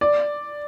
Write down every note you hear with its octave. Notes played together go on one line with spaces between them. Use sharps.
D5